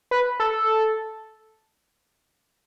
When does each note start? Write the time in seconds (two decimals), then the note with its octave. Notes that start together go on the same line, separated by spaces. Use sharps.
0.11 B4
0.40 A4